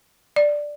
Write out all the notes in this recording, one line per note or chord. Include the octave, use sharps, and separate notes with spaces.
D5